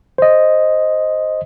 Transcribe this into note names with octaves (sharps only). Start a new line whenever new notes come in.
C5 D#5